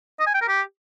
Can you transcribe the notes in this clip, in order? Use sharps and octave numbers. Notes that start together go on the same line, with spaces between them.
D#5
G#5
G5
A#4
G4